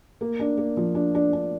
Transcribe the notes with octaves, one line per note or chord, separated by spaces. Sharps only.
A#3
D4
A#3
F3
D4
D4
D4